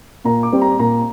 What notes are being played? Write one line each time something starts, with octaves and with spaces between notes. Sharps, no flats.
A#2 A#5
D6
G3 C4
A#5
A#2 A#5